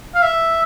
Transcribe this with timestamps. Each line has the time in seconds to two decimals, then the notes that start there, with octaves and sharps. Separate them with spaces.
0.15 F5
0.23 E5